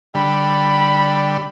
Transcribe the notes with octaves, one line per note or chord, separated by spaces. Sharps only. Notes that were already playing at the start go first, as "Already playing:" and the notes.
D3 G3 B5